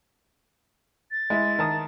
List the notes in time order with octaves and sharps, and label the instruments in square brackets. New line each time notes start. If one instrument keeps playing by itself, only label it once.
[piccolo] A6
[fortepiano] G#3 E4
D#3 A5 D#6